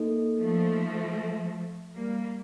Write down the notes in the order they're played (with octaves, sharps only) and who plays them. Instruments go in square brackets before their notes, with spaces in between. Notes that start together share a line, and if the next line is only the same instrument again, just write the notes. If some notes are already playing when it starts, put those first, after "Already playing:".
Already playing: [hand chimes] A#3 D#4 A4 D#5
[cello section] F3 A3
G3 A#3